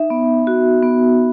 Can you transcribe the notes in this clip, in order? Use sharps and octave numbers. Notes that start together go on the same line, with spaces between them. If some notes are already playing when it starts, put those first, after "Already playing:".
Already playing: D#4 E5
B3
F#4
B3